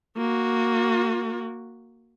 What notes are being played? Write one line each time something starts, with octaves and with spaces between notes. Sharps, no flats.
A#3 F#4